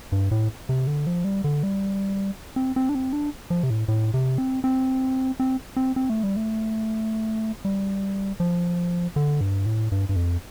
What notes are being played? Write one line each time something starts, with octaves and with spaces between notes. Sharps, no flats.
G2
A2
C3
D3
F3
G3
D3
G3
C4
C4
D4
C4
D4
F3
C3
A2
A2
C3
C4
C4
C4
C4
C4
A3
G3
A3
G3
F3
D3
G2
A2
G2
G2
F2